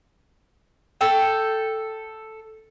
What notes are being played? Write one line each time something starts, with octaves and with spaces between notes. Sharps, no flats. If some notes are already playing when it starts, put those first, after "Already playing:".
A4 G5